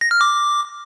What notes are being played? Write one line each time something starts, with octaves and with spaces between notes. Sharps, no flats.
A#6
F6
D6